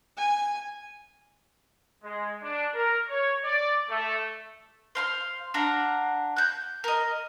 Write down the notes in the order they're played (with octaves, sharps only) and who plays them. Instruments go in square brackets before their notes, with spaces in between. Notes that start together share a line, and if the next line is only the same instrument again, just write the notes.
[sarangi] G#5
[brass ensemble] G#3
D4
A#4
C#5
D5
A3
[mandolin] C5 F5 C6
D4 F5 F#5 A#5
F#6 G6
A#4 D#5